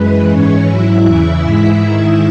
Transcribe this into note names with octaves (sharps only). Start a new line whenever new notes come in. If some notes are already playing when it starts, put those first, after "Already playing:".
Already playing: F#2 E3 G#3 B4
G#2 E3 G#3 C#4 C#5
G#2 F#3 E4 E5
E2 C#3 E3 E4 E5
G#2 E3 G#3
G#2 D#3 G#3